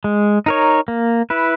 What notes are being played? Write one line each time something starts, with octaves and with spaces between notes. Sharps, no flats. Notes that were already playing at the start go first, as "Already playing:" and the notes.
G#3
D#4 A#4 C#5
A#3
E4 B4